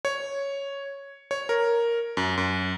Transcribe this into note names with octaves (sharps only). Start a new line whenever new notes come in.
C#5
C#5
A#4
F#2
F#2